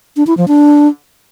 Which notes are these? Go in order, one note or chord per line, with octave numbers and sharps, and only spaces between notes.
D4
E4
F3
D4